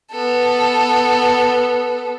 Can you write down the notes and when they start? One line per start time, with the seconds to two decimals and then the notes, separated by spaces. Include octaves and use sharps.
0.12 B3 A4